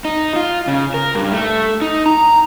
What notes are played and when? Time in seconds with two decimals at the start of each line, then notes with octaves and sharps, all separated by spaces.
0.05 D#4
0.36 F4
0.67 C#3
0.94 A#4
1.15 G2
1.32 A3
1.82 D#4
2.06 A#5